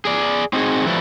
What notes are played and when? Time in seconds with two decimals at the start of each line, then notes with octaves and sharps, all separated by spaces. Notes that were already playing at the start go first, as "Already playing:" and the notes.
0.05 G#4 D5
0.53 C4 D#4 F#4 G#4
0.86 F3 G3 A3 E4 B4